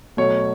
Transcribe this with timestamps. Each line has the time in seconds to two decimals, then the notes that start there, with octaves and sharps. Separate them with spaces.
0.17 B2 F#3 A3 C#5